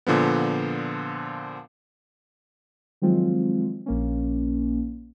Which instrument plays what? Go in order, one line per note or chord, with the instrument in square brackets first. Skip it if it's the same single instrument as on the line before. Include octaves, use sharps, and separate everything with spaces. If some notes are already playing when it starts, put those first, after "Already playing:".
[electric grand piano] A#2 D3 F3 B3
[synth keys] D#3 F3 F#3 G#3 C4 F4
A#1 A#3 C#4